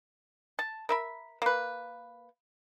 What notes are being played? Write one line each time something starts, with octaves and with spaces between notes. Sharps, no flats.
A5
A#4 E5 B5
A#3 B4